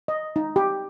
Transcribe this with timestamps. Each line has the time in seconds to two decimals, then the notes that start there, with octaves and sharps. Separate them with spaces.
0.08 D#5
0.36 D#4
0.56 G4